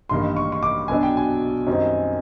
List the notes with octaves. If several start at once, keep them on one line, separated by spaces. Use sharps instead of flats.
A1 G2 D#3 G3 A#3 C6
C#6
C#6
D6
B1 B2 F#3 B3 D4 G#5
G5
G#5
F#2 D#3 G3 C4 D#4